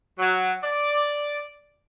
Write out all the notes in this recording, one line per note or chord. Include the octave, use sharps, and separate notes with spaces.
F#3
D5